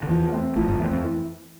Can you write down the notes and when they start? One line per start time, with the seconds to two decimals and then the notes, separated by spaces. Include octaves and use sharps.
0.03 D3
0.09 E2 E3 F3
0.32 A3 C4
0.56 A1 A2 F3
0.68 G1 G2
0.80 E2 A3 C4
0.91 F2
1.03 E3